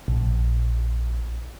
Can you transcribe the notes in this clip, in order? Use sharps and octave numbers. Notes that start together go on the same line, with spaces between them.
A#1